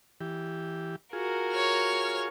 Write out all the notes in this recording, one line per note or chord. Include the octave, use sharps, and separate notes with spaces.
E3 G4
F4 F#4 G#4 A#4
C#5 F6